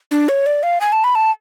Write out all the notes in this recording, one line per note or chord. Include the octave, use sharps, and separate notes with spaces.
D4
C#5
D5
F5
G#5
A5
B5
A5